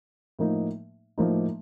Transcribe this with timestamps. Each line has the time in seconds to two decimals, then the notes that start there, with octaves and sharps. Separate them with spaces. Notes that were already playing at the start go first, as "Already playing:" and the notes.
0.39 A2 F3 A#3 D#4
1.18 A2 F3 A#3 D#4